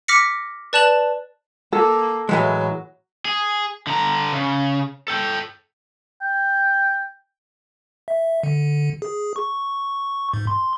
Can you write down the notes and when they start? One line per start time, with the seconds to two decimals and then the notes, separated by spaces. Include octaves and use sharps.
0.08 D6 F6 A#6 B6 C#7
0.73 B4 D5 A5 F#6 E7 F#7
1.73 A#3 A4
2.29 A2 E3 F#3 G#3
3.25 G#4
3.87 D3 A#5
4.33 C#3
5.08 A4 G5
6.21 G5
8.08 E5
8.43 D3
9.02 G#4
9.36 C#6
10.33 G#2
10.47 C6